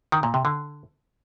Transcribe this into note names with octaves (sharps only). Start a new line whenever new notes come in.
D#3
A#2
C3
D3